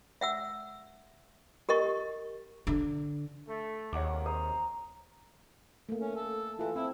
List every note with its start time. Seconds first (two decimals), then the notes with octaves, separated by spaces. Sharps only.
0.21 E5 F#5 E6
1.69 G4 A#4 D#5 C#6
2.67 D3
3.47 A3
3.93 G#1 D#2 C3 D#3 C#5 F#5 D6
4.26 C5 A#5 D#6
5.89 A3 A#3
6.00 C#4
6.16 A4
6.59 E3 F4 A4
6.76 C4 E4